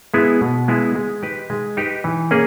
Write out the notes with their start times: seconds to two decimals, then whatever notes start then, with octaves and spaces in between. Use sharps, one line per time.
0.14 G#3 B3 E4 G#4
0.41 B2
0.68 G#3 B3 E4 G#4
0.95 G#3
1.23 D#4 G4 B4
1.50 G#3
1.77 D#4 G4 B4
2.04 E3
2.31 A#3 C#4 G#4